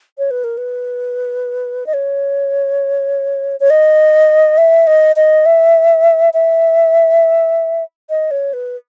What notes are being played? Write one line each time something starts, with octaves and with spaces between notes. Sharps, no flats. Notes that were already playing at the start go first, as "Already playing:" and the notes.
C#5
B4
A#4
B4
D#5
C#5
C#5
D#5
E5
D#5
D#5
E5
E5
D#5
C#5
B4